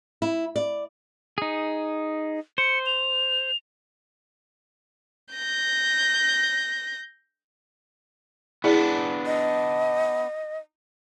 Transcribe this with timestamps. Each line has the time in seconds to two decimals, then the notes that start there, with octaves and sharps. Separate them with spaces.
0.22 E4
0.56 D5
1.38 D#4 G#4
2.58 C5 C#7
2.86 F7
5.34 G6 A#6
8.64 B3 D4 E4 G#4 D5
9.26 D#5